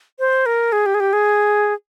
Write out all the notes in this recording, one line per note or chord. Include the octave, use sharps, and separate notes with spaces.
C5
A#4
G#4
G4
G#4
G4
G#4